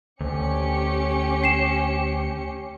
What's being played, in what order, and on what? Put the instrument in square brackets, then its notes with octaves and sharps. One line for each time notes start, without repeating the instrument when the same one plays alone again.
[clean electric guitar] D2 [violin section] C#4 G4 C#7
[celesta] C7 E7